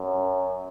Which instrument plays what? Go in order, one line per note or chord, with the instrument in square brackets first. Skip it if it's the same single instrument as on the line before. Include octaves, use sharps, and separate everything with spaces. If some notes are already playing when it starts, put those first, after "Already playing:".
Already playing: [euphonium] F#2